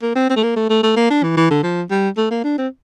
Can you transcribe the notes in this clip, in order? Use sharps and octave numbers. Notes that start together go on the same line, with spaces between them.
A#3
C4
C4
A3
A#3
A3
A3
A3
A#3
D4
E3
E3
D3
F3
G3
A3
A#3
D4
C4